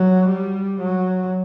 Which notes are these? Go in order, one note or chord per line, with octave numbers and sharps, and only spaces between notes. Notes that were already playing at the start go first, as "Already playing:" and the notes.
Already playing: F#3
G3
F#3